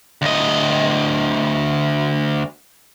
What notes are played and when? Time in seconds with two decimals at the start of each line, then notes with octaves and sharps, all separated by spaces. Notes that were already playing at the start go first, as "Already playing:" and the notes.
0.22 D2 D#5